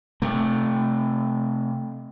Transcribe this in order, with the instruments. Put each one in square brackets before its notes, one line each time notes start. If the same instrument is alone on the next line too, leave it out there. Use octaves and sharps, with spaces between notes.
[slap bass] C3 A3